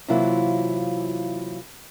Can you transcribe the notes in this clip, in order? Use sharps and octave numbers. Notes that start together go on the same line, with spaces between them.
C3 E3 F#3 A#3 E4 F4